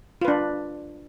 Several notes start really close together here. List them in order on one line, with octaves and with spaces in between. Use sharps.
F4 B4 D4